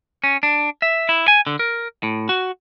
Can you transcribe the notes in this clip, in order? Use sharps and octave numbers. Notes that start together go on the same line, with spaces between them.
C#4
D4
E5
E4
G#5
D3
A#4
A2
F#4